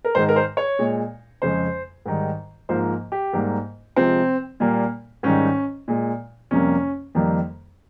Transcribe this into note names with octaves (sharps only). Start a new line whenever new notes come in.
A#4
G#2 D#3 G#3 C5
A#4
C5
C#5
A#2 G#3
F2 C#3 G#3 C5
G#2 D#3 G3
G#2 F3 A#3 C5
G4
G#2 G3 A#3
C3 F3 G#3 C4
A#2 G3 A#3
G#2 D#3 G3 C#4
A#2 G#3
F2 C3 G3 A#3 C#4
F2 D#3 G3 A#3